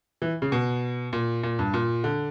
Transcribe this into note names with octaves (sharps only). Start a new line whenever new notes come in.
E3
C#3
B2
A#2
A#2
G2
A#2
D3